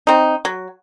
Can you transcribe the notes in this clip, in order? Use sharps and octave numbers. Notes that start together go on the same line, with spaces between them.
C4 D#4
F#3